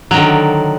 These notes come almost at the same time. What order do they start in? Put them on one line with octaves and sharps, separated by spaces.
F#3 D#3 D3